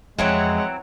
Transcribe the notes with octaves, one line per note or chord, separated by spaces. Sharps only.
F2 E3 F#3 G#3 C4 C#5 F#5